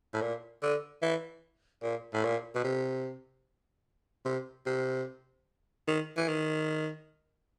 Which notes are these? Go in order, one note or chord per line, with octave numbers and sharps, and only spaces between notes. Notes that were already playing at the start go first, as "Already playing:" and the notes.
A2
A#2
D3
E3
A#2
A2
A#2
B2
C3
C3
C3
D#3
E3
D#3